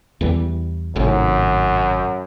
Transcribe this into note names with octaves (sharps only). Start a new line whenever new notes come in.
E2 E3 G3
G#1 F#2 A2 C3